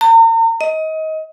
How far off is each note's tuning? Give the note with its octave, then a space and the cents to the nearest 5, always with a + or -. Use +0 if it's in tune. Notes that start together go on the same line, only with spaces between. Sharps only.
A#5 -40
D#5 +25